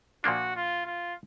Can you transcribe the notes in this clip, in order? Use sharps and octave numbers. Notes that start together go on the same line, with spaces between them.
A#2 F3 A#3 D4 F#4
F4
F4